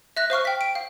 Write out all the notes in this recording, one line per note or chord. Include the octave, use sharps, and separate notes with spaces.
E5 F#6 A#6
C5 F5 C#6 F6
G5 B6
D7
F5